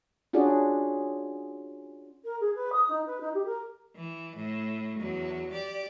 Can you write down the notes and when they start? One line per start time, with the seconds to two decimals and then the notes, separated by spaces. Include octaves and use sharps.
0.33 C#4 D4 F4 F#4 G#4 D5
2.24 A#4
2.40 G#4
2.55 B4
2.72 D#6
2.89 D#4
3.06 B4
3.20 D#4
3.34 G4
3.46 A#4
3.96 E3
4.36 A2
4.99 E2 F#3
5.53 G4 D5